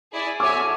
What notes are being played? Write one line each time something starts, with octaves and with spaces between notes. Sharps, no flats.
E4 G#4 D5
F#4 A4 C#5 E5 G#5 D6